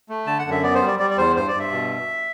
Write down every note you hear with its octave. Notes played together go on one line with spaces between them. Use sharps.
A3
D3 A5
F#5
F#2
E5
B3 D5
C5
G3
D5
G3 D5
D5
E2 C5
G2 C5
D5
G2
E5
B2